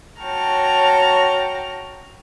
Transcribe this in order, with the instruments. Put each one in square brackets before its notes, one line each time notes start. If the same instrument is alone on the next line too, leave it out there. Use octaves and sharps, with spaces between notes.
[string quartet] F#4 C#5 G5 A5 A#5 F6